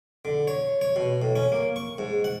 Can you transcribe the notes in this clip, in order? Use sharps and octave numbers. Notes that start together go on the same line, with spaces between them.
D3
C#5
C#5
B2
A2
C#4
A#3
C#6
G#2
F#5